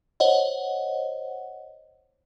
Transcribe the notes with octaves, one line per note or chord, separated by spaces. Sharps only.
C5 C#5 D#5 F#5